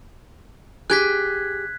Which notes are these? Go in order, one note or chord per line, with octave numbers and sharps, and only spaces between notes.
G4 G#4 F#6 G#6 B6